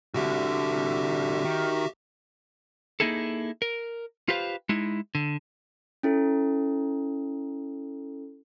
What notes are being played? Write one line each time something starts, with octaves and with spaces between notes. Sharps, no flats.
C2 D3 F#4 G4 E5
D#3
A#3 D#4 E4 G#4 A4
A#4
F4 G4 B4 C5 F5
G#3 D#4 E4
D3
C#4 E4 A4